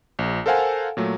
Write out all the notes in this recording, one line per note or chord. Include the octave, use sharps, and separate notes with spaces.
A#1
A4 A#4 C5 F5 F#5 G#5
A#2 F#3 A3